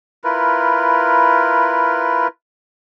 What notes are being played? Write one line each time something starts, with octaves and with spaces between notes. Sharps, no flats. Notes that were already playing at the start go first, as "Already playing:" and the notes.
E4 F4 A#4 B4